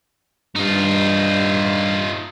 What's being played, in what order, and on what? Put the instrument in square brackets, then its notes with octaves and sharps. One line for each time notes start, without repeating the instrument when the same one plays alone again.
[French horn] G2 [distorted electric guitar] D#4 F4